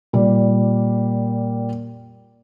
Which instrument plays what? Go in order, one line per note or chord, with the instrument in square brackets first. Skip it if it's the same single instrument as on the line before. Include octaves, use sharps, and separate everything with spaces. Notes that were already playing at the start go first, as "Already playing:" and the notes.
[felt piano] A#2 G3